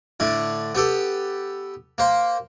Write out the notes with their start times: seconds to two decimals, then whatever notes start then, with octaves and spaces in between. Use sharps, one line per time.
0.20 A2 D3 D4
0.75 B3 G4 A4
1.98 A#3 C5